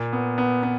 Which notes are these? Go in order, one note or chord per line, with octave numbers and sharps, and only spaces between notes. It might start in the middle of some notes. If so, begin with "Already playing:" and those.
Already playing: A#2
B3
B3
B3